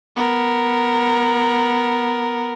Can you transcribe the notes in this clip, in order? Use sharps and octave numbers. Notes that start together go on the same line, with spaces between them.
B3 A#4